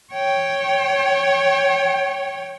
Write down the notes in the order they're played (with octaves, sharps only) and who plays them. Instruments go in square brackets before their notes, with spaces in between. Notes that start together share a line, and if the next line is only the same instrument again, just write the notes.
[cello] C#5 G5